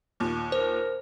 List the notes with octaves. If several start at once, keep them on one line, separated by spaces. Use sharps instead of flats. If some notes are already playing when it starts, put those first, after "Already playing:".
D#2 A#2
A#4 C5